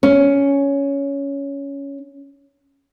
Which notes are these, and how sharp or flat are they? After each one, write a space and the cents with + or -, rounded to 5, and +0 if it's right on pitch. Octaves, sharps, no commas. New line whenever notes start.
C#4 +10